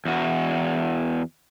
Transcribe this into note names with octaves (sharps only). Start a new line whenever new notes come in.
E2 F#4